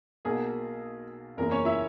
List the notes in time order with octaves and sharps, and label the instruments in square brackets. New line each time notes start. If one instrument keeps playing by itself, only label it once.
[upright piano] B1 B2 A#3 G#4
F#1 E2 C#3 E3 A#3 A#4
C#4 C#5
E4 E5